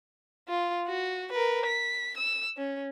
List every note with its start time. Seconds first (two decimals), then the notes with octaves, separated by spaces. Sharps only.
0.49 F4
0.88 F#4
1.32 A#4 B4
1.66 B6
2.17 E6
2.58 C#4